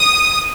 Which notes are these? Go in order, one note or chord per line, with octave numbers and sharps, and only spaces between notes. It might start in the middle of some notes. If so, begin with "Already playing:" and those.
Already playing: D#6